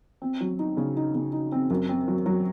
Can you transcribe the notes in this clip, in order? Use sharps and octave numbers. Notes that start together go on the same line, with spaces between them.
C4
F#3
D#4
C#3
D#4
C#3
D#4
C4
F#2
C4
F#3
F#3